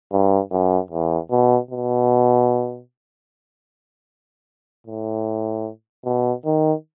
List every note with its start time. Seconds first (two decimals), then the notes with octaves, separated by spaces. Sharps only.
0.12 G2
0.51 F#2
0.91 E2
1.31 B2
1.70 B2
4.87 A2
6.05 B2
6.45 D#3